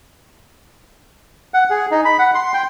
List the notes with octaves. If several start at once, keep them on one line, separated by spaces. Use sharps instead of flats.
F#5
G#4
D#4
B5
F#5
C6
G5